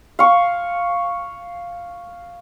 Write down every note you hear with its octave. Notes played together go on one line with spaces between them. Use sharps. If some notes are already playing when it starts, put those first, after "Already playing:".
F5 C#6